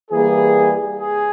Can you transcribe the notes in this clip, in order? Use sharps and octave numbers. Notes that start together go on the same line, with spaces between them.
E3 G3 A#3 G#4
G#4